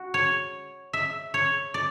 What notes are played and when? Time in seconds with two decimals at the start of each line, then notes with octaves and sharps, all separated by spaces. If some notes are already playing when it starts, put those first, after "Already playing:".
Already playing: F#4
0.14 C#5
0.93 E5
1.34 C#5
1.74 D5